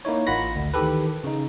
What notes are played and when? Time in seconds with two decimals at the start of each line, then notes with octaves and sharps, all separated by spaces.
0.05 A#3 D#4 E4 C#5
0.27 A1 F4 F#5 B5 A#6
0.56 D2
0.74 D#3 E3 G4 A4 B4
1.24 C#3 D#4